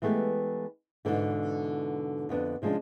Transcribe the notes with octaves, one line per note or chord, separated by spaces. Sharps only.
E3 G#3 A3 B3 G4
G#2 B2 D3 E3
F2 D3 B3 D4
C3 F3 G#3 C#4 D4